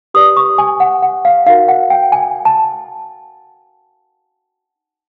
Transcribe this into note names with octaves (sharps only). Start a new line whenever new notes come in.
G4 B4 D5 D#6
C#6
G#5
F#5
F#5
F5
D#4 F#4 A#4 F5
F#5
G5
G#5
A5